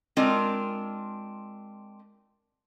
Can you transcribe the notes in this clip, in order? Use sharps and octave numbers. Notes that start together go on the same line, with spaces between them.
G#3 C4 D4 F4 A#4